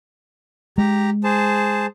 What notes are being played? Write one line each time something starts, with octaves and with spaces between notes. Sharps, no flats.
G#3 G4 A#5
G#4 C5 A5